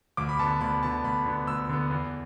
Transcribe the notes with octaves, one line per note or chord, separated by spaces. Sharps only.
D2 D6
B5
D3 B3 A5
D2 B5
D3 B3 A5
D2 B5
D3 B3
D2 E6
D3 B3
E2